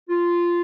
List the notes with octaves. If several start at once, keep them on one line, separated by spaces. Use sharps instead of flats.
F4